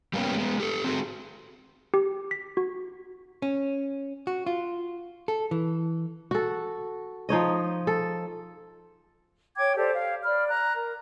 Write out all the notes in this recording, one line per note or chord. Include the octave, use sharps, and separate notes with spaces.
G3 A#3 B3 C#4 G4
G#3 B3
G4 A4
C4 F#4 G#4
G4
B6
F#4
C#4
F#4
F4
A4
E3
F#4 A4
F3 D#4 C#5 D#5
A4
C#5 G5 D6 G#6
G4 A4 C5 D5
F5
D5 B5 F6
A#5 F#6
A#4